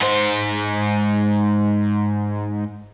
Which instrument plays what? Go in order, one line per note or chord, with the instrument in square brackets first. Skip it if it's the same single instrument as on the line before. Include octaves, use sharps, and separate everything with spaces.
[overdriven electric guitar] G#2 C5